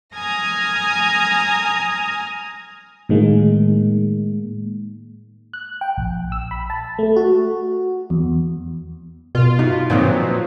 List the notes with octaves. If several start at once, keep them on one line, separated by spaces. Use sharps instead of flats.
G#5 A#5 D#6 F6 G#6 A#6
A2 D#3 G#3 A#3
F#6
G5
A#1
E6
B5
A5
A3
F#4
E2
B2 F4
D#4 E4 F#4
A#2 D#3 F3 F#3 C4
B4